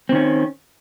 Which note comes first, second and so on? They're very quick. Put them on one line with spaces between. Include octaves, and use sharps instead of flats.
C4 D#3 C#4